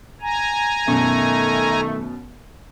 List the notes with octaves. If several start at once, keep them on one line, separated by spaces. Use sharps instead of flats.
G#5 A#5
F#2 B2 D#3 A3